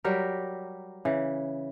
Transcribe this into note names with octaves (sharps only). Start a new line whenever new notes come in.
F#3 G3 G4 A#4
C#3 E3